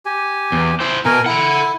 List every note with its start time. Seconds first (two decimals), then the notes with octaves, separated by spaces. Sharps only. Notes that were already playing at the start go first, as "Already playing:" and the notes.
0.06 G4 G#5
0.52 E2
0.80 E4 C5
1.05 B2 A#4 G#5 A#5
1.26 E4 A4 F#5